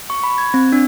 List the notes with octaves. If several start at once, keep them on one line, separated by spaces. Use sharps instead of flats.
C#6
B5
G#6
C4
D4